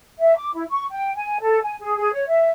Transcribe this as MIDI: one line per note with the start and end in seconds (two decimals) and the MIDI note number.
0.19 0.34 76
0.36 0.50 86
0.54 0.64 64
0.70 0.84 85
0.90 1.14 79
1.15 1.37 80
1.41 1.58 69
1.62 1.75 80
1.80 1.94 68
1.97 2.11 68
2.13 2.25 73
2.28 2.50 76